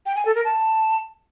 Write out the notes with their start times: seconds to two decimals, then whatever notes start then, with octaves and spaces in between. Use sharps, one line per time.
0.06 G5
0.16 G#5
0.25 A4
0.35 A#4
0.45 A5